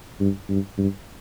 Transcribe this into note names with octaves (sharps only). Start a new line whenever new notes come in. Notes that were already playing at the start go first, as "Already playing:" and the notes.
G2
G2
G2